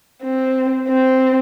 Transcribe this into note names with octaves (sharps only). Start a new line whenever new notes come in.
C4
C4